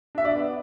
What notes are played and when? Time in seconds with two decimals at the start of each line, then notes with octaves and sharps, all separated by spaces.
0.15 D4 E5
0.25 D5
0.35 B3